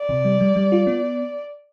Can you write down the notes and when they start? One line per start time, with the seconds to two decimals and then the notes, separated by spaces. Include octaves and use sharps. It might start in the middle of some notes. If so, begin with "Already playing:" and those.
Already playing: D5
0.09 C3
0.25 G3
0.41 G3
0.56 G3
0.72 F4
0.87 B3